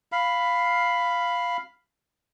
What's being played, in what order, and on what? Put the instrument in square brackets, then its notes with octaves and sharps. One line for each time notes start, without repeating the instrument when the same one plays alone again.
[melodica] F5 B5